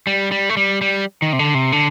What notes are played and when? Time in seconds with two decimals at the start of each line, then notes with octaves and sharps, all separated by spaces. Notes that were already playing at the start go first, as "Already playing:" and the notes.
0.07 G3
0.31 G3
0.49 A3
0.57 G3
0.81 G3
1.22 D#3
1.33 C3
1.39 D3
1.55 C3
1.72 D3